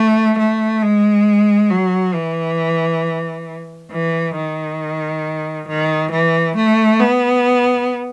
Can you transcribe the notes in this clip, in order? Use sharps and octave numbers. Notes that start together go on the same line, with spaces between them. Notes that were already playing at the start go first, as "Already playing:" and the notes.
Already playing: A3
A3
G#3
F#3
E3
E3
D#3
D#3
E3
A3
B3